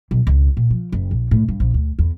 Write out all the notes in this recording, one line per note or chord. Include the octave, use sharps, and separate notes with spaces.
B1
C#2
A#2
F3
F#1
A#1
A2
G2
A#1
D2
E2